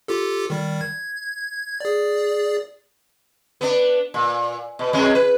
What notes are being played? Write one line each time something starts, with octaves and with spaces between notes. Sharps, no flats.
F4 G4 A4
D#3 G3
G#6
G#4 D5
B3 D4
A#2
B2
F2 G#3 C#4
B4